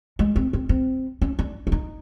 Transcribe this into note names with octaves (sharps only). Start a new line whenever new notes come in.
G#3
C4
C4
C4
C#4
D4
E4
D#4